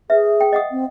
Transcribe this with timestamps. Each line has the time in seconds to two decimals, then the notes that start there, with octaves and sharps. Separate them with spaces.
0.10 G#4 B4 E5
0.41 G5
0.52 D#5 F#5 D#6
0.71 C4